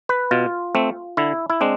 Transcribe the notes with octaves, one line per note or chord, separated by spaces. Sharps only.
B4
B2 F4
A3 C4
D3 E4
E4
G#3 C4 D4